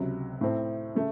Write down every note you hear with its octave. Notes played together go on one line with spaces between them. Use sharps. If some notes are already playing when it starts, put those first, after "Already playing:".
Already playing: C#2 C3 F#3
A2 A3 C4
C#3 A3